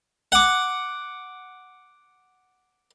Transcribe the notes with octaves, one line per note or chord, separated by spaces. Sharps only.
F#5 D6